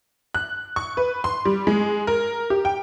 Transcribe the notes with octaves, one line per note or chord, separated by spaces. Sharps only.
F#6
C#6
B4
C6
G3
G#3
A#4
G4
G5